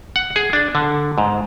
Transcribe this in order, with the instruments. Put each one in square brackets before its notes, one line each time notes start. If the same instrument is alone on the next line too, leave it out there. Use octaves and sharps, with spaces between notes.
[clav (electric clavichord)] F#5
G#4
D4
D3
G#2